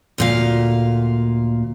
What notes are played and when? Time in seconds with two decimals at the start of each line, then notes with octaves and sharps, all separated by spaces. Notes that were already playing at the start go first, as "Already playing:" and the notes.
0.18 D2 A#2 F5